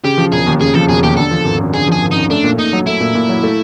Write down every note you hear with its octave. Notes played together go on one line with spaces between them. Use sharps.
C#3 G4
F3
E1 G#4
D#2
C#3 G#4
F3 A4
E1 G#4
D#2 G4
D3 A4
F3
G#1
F#2
D3 G#4
F3 G#4
G#1
F#2 D#4
A3 D4
A#2
A#2 D#4
F#3
A3 E4
A#2
A#2
F#3
A3